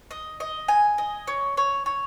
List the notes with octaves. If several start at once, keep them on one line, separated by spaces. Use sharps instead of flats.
D#5
D#5
G#5
D#5
C#5
C#5
C#5